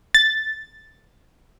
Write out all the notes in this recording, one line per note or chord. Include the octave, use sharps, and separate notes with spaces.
A6